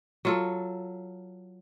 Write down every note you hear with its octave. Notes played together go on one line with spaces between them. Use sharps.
F#3 F4 A4